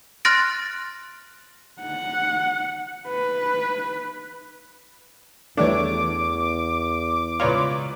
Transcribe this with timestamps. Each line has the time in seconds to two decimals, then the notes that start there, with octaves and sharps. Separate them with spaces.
0.25 C6 F6 F#6 A6 A#6 D7
1.81 F#5
3.08 B4
5.57 E2 E3 G3 A3 D4 C#5 D6
7.40 C#2 F4 B4 C#5 D5 A#5